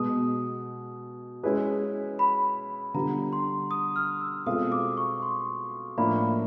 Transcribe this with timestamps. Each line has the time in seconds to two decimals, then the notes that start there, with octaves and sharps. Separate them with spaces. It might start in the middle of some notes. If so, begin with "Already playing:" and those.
Already playing: B2 G#3 B3 D#6
1.43 G#3 C#4 E4 G#4 B4
2.19 B5
2.94 D3 G3 B3 D4 F4 A#5
3.33 C6
3.71 D#6
3.96 F6
4.21 E6
4.46 B2 G#3 C4 F4 A4 D#6
4.72 D6
4.97 C#6
5.22 C6
5.98 A2 F3 A#3 D4 B5